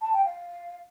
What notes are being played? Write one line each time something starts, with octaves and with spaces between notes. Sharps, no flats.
A5
G5
F5